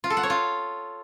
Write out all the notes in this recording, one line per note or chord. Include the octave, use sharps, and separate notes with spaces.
F4
A4
F#5
C#5
F4